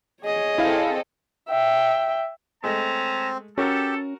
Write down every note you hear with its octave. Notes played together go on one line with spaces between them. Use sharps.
G#4 C#5 D#5
C4 E4 A4 F5
E5 G5
G#3 A3 C4 C#4 A5 A#5
C#4 F#4 G4 A4 A#4